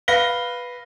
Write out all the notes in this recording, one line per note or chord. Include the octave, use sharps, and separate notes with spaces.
B4 F5 A#6 G7